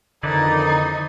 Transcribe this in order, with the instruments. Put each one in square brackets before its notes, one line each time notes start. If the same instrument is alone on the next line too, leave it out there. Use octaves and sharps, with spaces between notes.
[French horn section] F2 D#3 [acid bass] D3 [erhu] D#4 [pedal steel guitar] E4 B4 D5